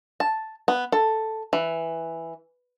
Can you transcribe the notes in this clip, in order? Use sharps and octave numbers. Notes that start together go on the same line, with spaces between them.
A5
B3
A4
E3